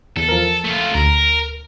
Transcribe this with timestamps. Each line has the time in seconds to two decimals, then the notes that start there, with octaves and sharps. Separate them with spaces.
0.17 E2 A4
0.29 F3 A#4
0.65 A3 F4
0.94 D2 A#4